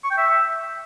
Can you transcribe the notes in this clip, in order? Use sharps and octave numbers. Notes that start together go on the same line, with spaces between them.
C#6
G5
E5